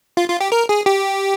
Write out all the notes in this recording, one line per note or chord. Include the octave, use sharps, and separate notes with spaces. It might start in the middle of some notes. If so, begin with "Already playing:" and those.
F4
F4
G4
A#4
G#4
G4